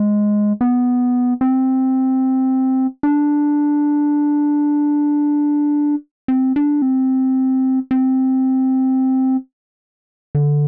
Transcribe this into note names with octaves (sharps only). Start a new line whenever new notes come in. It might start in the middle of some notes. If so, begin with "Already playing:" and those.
Already playing: G#3
B3
C4
D4
C4
D4
C4
C4
D3